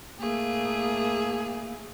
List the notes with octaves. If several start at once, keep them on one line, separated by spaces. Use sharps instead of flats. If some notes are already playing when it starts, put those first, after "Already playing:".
A2 A3 A#3 G#4